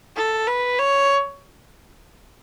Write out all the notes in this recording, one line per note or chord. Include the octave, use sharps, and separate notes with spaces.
A4
B4
C#5